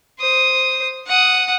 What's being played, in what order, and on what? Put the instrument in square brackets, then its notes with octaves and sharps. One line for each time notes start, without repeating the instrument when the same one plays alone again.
[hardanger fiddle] C5 D#6
F#5 D#6